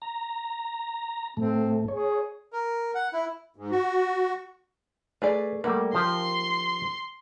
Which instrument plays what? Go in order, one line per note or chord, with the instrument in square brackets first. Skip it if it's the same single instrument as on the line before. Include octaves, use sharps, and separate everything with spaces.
[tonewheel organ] A#5
[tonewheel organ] A2 A3 [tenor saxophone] C4
[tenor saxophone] G#4 [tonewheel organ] C#5
[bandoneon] A#4
F#5
E4
[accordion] G#2
F#4
[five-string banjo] A3 G#4 D5 [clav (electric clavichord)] B4
[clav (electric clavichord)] G3 A3 F#5 [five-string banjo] A#3
[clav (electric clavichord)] F3 G4 [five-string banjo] A#4 [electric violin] C6